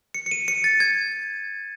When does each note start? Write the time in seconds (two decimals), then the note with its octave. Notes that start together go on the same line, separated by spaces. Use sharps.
0.14 C#7
0.26 C#7
0.31 D#7
0.48 C#7
0.64 A6
0.80 G#6